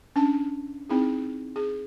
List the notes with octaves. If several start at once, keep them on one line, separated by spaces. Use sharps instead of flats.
C#4 D4 A5
C4 D#4 E4 G#4
G#4